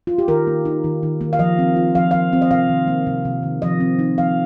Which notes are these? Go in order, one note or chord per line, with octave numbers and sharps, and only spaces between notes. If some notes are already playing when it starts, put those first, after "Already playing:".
F4
G4
D#3 A#4
A#3
D#4
D#3
D#3
A#3
F5
F3 D#5
C4
F4
F3 F5
F3 F5
C4
D#5
C3 F5
D#3
A#3
C3
C3
D#3
F3 D#5
C4
D#4
F3 F5